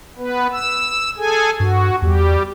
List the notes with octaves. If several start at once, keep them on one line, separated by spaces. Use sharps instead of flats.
B3 B4
E6
G#4 A4 G#5
G2 F#4
E2 G3 G4